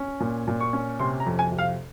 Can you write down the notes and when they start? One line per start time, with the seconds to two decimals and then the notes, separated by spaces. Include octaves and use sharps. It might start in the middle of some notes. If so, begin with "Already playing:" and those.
Already playing: C#4
0.20 A#2
0.48 A#2
0.60 C#6
0.73 C#4
1.00 C3 C6
1.20 A#5
1.26 F2
1.39 G#5
1.52 C3
1.59 F5